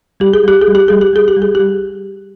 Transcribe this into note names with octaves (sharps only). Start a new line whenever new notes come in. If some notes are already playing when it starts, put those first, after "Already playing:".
G3 G4
G#4
G3 G4
G#4
G3
G4
G3 G#4
G4
G3 G#4
G4
G3
G#4
G3 G4